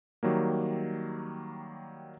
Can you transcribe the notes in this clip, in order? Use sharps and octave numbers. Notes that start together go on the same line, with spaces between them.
D#3 F#3 G3 A#3